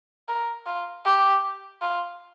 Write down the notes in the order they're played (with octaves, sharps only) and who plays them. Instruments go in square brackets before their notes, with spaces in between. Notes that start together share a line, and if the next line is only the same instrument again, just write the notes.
[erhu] A#4
F4
G4
F4